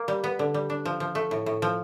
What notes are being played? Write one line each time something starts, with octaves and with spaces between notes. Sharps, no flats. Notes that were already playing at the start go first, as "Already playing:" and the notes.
Already playing: A#3
G3
B3
D3
G3
D4
F3
F3
A3
A2
A2
F3